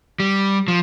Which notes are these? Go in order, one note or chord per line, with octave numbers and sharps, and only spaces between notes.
G3
F3